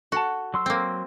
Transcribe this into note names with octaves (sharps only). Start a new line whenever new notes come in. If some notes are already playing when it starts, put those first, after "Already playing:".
F#4 A4 F#5 A5
F#3 C6 E6
A#3 C4